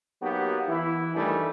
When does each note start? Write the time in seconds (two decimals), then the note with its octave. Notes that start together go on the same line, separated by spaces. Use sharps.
0.22 F#3 A#3 B3 D#4 F#4 G4
0.68 E3 E4
1.15 G2 D#3 E3 G3 A3